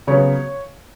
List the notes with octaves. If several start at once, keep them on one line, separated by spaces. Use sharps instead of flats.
C#3 F#3 B3 C#5